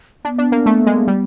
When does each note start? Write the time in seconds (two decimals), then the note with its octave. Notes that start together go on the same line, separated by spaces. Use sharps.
0.24 B3 D4
0.38 D4
0.52 A#3
0.66 A3
0.86 G#3
1.08 G3